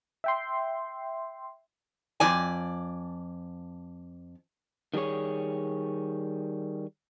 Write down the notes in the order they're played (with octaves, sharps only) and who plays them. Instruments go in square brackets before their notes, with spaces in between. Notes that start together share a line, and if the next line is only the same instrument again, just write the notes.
[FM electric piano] E5 G5 C6
[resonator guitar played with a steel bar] F2 D5 G#5
[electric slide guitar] D#3 G3 A#3 G#4 C#5